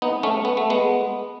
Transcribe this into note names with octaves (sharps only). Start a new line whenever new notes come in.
B3 D#4
A3 C#4
B3
A3
G#3 B3